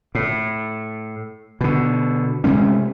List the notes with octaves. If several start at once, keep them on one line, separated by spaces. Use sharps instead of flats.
A2
B2 D3
C3 G#3 A3 C#4